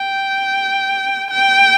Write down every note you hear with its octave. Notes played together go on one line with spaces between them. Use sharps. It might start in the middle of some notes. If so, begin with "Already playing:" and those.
Already playing: G5
G5